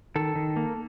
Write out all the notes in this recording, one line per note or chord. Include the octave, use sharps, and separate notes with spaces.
D#3 A4
D#3
A#3